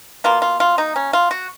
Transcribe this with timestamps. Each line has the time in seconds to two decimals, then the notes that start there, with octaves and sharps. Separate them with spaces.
0.24 B2 A#3 F4
0.42 F4
0.60 F4
0.78 D#4
0.96 C#4
1.13 F4
1.31 F#4